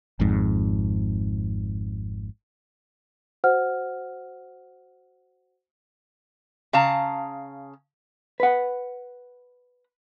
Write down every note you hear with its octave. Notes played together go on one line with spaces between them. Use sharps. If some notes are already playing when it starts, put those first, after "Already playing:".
G#1 F2 G#2
F#4 C5 F#5 F6
C#3 F5 A5 A#5
B4 F#5